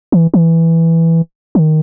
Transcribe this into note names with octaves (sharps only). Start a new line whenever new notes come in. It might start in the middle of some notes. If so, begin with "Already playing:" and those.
E3
E3
E3
D#3